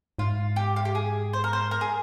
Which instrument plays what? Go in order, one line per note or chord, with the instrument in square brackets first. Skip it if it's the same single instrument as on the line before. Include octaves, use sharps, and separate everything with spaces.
[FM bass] G#2 [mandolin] F4
[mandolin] G4
F4
G4
G#4
C5
A#4
C5
A#4
G#4